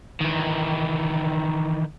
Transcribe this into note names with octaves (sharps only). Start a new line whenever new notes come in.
D#3 E3